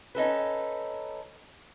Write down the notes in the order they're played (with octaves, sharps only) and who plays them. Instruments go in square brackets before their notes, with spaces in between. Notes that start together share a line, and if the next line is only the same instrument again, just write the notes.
[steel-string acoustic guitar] C#4 D#4 A4 B4